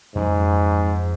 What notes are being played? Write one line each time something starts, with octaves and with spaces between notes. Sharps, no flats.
F2 G#2 F#3